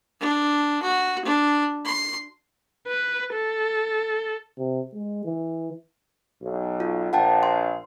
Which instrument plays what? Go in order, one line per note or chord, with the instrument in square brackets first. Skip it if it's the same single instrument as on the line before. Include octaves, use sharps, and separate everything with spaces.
[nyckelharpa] D4
F#4
D4
C6
[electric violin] B4
A4
[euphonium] C3
G#3
E3
[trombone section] B1
[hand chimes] F4
[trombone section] A#1 [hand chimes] F#5 G5 A5
[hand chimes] C6